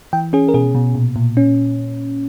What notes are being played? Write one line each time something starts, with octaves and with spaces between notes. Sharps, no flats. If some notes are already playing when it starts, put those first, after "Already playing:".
E3 G5
C#4 G#4
A#4
B2 G#4
B2
A#2
A#2
C#4